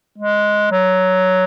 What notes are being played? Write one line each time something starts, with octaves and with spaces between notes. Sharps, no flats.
G#3
F#3